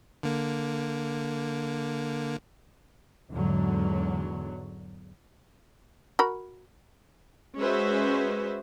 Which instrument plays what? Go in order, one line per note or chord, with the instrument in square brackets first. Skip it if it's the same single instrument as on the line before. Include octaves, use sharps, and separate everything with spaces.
[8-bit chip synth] D3 A#3
[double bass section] E2 G#2 D3 F#3
[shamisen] F#4 A#4 B5
[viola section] G#3 C#4 F#4 B4 C5 E5